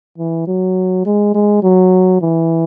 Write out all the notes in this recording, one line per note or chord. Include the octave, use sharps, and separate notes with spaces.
E3
F#3
G#3
G#3
F#3
E3